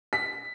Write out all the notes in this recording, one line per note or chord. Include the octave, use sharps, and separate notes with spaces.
B6